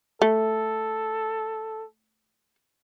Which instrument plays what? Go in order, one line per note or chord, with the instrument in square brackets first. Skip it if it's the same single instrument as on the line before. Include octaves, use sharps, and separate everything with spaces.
[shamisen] A3 [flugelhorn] A4